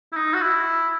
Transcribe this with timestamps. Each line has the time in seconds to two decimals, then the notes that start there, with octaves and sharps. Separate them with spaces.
0.12 E4
0.16 D#4
0.34 F#4
0.42 E4